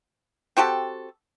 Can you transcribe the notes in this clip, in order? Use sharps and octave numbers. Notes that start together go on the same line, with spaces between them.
C4 F#4 G4 A4